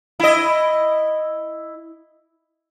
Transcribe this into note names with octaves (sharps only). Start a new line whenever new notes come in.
E4 D#5